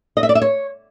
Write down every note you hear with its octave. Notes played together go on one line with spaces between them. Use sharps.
D#5
E5
D5
E5
C#5